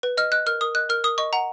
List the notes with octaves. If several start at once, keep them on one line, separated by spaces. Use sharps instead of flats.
B4
D#5 F6
D#5 F#6
A#4 F6
A#4 D#6
D#5 F#6
A#4 F6
A#4 D#6
D#5 C#6
F#5 A#5